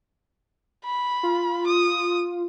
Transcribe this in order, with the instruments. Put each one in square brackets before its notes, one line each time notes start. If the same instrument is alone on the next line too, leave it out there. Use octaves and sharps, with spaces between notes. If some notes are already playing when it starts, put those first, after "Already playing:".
[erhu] B5
[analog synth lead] F4
[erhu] D#6